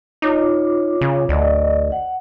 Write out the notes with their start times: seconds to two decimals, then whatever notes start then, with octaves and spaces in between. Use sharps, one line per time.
0.22 D#4 F4 C#5 D6
1.01 C#3
1.29 D2 D5 D#5
1.92 F#5